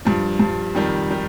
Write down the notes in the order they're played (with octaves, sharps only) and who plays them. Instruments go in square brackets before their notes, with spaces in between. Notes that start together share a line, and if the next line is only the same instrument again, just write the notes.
[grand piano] G2 F3
G2 F3
F2 D#3 G3
D#3 G3